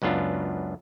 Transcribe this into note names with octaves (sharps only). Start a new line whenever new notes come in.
C#2 F#2 B3 D4 F4